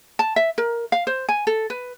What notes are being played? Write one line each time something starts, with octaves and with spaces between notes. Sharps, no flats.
A5
E5
A#4
F5
C5
G#5
A4
B4